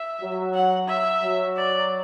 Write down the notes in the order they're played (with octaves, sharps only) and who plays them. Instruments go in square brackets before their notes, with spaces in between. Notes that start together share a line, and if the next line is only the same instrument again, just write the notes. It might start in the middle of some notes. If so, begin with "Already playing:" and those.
Already playing: [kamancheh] E5
[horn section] F#3
[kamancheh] F#5
E5
[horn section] F#3
[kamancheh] D5